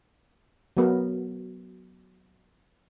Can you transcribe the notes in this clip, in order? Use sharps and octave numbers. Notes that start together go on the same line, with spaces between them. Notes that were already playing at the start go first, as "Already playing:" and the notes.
F#3 B3 A#4